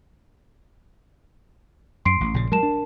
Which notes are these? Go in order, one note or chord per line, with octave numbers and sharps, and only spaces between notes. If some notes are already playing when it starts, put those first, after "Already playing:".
F#2 C6 C7 D7
A1
A#1 A#2 C#3
F#3 G#3 A#4 A5 E7
D4